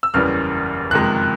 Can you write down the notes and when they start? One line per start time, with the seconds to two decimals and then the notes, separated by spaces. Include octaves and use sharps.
0.03 E6
0.14 F#1 E2 C#3 E3 G3 F6
0.91 F#1 F2 C3 D#3 G#3 F#6